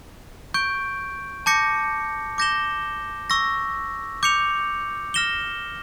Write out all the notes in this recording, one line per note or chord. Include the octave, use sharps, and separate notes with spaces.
C#6 G6 D7
A5 D6 G6 A#6 C#7
D6 G6 A#6 E7 G7
C#6 E6 A#6
D6 G6 C#7 F7
F6 A#6 E7 G7